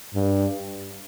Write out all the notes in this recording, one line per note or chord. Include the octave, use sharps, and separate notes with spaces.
G2